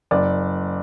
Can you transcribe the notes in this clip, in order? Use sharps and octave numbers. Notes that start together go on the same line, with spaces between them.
F#1 D5